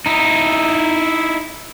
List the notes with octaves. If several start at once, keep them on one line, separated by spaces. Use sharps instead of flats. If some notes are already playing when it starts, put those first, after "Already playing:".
D#4 E4